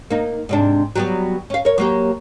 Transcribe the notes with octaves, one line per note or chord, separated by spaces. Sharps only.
A#3 D#4
G#2 C3 D4
F#3 G3 B3
C#4 F5
A#4 C#5
F#3 A#3 G4